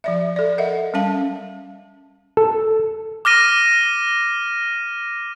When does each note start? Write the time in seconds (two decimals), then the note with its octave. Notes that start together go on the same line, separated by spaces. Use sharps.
0.04 F3 D5 E5
0.36 A4 D5
0.58 A#4 D#5 E5 F#5
0.94 G3 C#4 F5 A5
2.37 A4
3.25 D6 F6 A#6 D#7